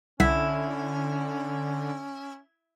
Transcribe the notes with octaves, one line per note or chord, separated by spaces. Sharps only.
C2 D3 C#4 E4 F#5 B6